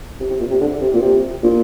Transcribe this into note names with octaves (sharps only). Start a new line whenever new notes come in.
C3
C3
A#2
C3
D3
C3
A#2
C3
A#2